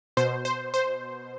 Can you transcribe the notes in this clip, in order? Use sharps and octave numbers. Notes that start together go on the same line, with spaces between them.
B2 C5
C5
C5